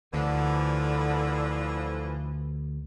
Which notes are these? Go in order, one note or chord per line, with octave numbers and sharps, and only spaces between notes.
D2 D3 E3 F3